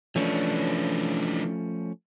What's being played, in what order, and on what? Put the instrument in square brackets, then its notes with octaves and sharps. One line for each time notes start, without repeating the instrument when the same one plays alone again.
[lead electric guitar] E3 D4 [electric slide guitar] F3 A3 C#4